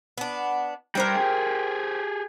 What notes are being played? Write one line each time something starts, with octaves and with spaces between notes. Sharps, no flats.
B3 D4
G3 D4 A#4 C5 G5
G4 G#4